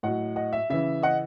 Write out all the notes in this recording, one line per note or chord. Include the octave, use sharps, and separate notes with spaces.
A2 F#3 D#5 F#5
D#5 F#5
E5
C#3 E3 E5
D#5 F#5